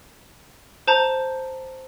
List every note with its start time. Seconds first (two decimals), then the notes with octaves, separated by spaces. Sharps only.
0.87 C5 A5 A#5 G6